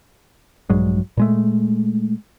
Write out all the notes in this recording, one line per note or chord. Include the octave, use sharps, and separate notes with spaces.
A#1 G2 F#3 G#3
A#2 G#3 A3